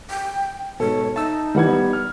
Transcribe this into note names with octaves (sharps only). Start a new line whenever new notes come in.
G5
G#2 B2 A4 C#5
D#4 E5 A5 E6
D2 D#3 E3 G3 F#5 G#6
B3
F6